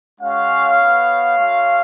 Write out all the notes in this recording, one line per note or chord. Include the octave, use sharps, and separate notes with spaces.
G#3 C#4 F#4 C#5 F5
B3 F#4
A3 F4